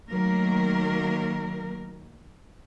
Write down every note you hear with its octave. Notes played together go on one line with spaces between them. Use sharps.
D#3 F#3 A3 A#3 A#4